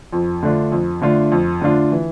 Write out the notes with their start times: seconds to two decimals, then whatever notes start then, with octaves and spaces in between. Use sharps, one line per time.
0.13 F2
0.43 D3 A3 D4 F4
0.72 F2
1.01 D3 A3 D4 F4
1.32 F2
1.61 D3 A3 D4 F4
1.92 E3